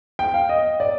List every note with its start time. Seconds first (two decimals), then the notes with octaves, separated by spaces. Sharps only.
0.19 G5
0.34 F5
0.49 D#5
0.80 D5